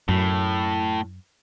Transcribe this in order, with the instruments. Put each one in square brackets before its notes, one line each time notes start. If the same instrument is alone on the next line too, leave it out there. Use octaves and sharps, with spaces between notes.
[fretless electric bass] F#2 [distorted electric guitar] A2